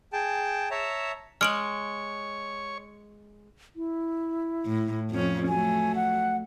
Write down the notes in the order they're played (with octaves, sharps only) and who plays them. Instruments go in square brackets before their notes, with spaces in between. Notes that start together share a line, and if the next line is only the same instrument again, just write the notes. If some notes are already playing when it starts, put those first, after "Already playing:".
[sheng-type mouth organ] G#4 G5 A5
C#5 E5 A5 A#5
[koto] G#3 [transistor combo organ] C#5 C#6 [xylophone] F6 D7 F#7
[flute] E4
[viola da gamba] A2
F2 C#4
[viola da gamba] F#3 A3 [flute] G#5
[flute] F#5